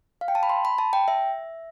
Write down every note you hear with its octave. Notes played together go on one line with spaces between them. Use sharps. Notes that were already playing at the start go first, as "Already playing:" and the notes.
F5
G5
A5
B5
C6
B5
A5
G5
E5